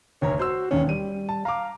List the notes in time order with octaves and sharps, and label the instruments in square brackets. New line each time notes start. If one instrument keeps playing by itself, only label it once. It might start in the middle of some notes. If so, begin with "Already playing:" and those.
[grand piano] F1 D2 A#5 [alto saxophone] C#5
[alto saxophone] F#4 [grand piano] C5 C6 E6
[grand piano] E1 D#2 [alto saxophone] C#4
[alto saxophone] G3 [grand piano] D#7
[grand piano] A5
[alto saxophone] F5 [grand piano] A#5 D6